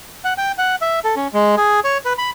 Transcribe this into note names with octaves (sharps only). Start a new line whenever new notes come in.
F#5
G5
F#5
E5
A4
C#4
G#3
G#4
C#5
B4
B5